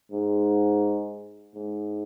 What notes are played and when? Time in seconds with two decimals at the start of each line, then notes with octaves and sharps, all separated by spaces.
0.12 G#2
1.55 G#2